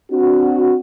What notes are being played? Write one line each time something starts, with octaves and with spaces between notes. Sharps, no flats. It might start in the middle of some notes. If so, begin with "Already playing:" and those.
C4 D4 F#4